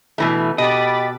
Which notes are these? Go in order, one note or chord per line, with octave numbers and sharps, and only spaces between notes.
B2 E3 A3
B2 G4 D#5 B5 D6 A6